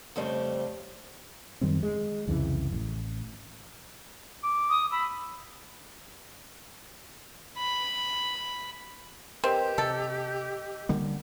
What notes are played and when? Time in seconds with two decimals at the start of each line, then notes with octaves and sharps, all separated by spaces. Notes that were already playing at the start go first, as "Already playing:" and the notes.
0.16 F2 C#3 G3 A3 C5
1.61 F#2 D#3 G3 C4
1.83 G#3
2.27 C2 F2 C#3 E3
2.73 A1
4.43 D6
4.70 D#6
4.92 B5 E6
7.58 B5
9.44 C4 G4 A#4 B4 D#5
9.78 C3 A4 D#5 E6
10.89 D3 G3 A#3